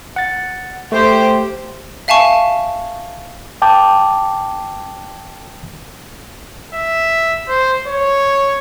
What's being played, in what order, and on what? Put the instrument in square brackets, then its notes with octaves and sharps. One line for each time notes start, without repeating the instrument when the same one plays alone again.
[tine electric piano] F#5 A6
[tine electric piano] A3 [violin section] G4 C5
[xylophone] E5 F5 G#5 A5 C#6
[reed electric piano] G5 A5 D6 G6
[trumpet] E5
C5
C#5